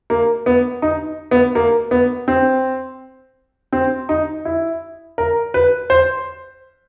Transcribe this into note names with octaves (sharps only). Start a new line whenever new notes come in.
A#3
B3
D#4
B3
A#3
B3
C4
C4
D#4
E4
A#4
B4
C5